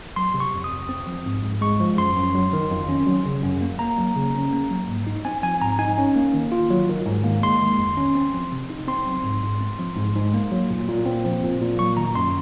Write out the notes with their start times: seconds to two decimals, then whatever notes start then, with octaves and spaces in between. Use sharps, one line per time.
0.16 F#3 C6
0.34 C3
0.40 C#6
0.53 F2
0.64 D#6
0.71 F2
0.89 C4
1.07 F3
1.25 G#2
1.43 G#2
1.61 G#3 C#6
1.80 F3
1.98 F#2 C6
2.16 F#2
2.35 F#3
2.53 D#3
2.71 F2
2.89 C#4
3.07 F#3
3.26 C#3
3.43 F#2
3.62 A#3
3.79 A#3 A#5
3.98 F#3
4.16 C#3
4.35 C#4
4.53 A#3
4.71 F#3
4.88 G#2
5.07 D#4
5.25 C4 G#5
5.43 F3 G#5
5.61 G#2 A#5
5.79 D#4 G#5
5.98 C#4
6.16 A#3
6.34 D#3
6.52 F4
6.70 F#3
6.89 D#3
7.06 G#2
7.24 A#3
7.42 G#3 C6
7.61 D#3
7.79 F2
7.97 C#4
8.15 C4
8.34 F3
8.52 C3
8.70 D#4
8.88 C4 C6
9.06 F#3
9.24 G#2
9.43 G#2
9.61 C4
9.79 F3
9.97 G#2
10.15 G#2
10.34 A#3
10.52 F#3
10.70 A#2
10.88 A#2
11.06 C4
11.25 F3
11.43 A#2
11.61 A#2
11.79 F#3 C#6
11.97 D#3 A#5
12.15 F#2 C6